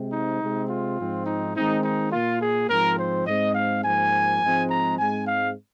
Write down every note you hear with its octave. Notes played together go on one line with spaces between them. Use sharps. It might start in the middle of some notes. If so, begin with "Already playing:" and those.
Already playing: C3 G#3 C4
D#4
C3 G#3 C4
F4
G#2 F3 C4
D#4
D#3 G#3 C4 D#4
D#4
A#2 A#3 F4
G#4
G#2 F3 C4 A#4
C5
G#2 G#3 C4 D#5
F5
G#2 F3 A#3 G#5
G#2 F3 G#3 C4
A#5
G#2 G#3 C4 G#5
F5